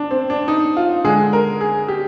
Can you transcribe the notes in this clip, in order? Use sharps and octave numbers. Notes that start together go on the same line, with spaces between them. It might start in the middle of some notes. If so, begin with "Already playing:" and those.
Already playing: D4
C4
D4
D#4
F4
D3 G#3 G#4
A#4
G#4
G4